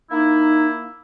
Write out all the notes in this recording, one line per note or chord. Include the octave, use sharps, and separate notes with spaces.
A#3 D#4 E4